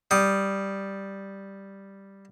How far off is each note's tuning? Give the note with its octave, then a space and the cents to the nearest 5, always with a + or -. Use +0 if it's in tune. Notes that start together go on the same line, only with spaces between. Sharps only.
G3 +0 D#6 +0